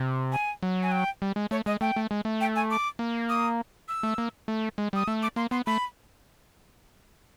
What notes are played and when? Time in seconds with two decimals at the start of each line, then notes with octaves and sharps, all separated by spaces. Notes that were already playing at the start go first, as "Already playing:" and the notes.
Already playing: C3
0.32 G#5
0.63 F#3
0.83 G#5
0.92 G5
1.22 G3
1.36 G#3
1.51 A3 C#5
1.66 G#3 D#5
1.81 A3 G5
1.96 A3
2.11 G#3
2.25 A3
2.41 G5
2.56 G#5
2.71 D6
2.99 A#3
3.29 D#6
3.88 E6
4.03 A3
4.18 A#3
4.48 A3
4.78 G#3
4.93 G3 D#6
5.08 A3 E6
5.23 D6
5.36 A#3 C6
5.51 B3 C6
5.66 A3 B5